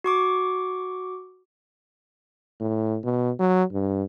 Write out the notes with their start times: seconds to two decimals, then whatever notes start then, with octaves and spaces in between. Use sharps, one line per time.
0.04 F#4 C#6 D6
2.60 A2
3.03 B2
3.39 F#3
3.72 G2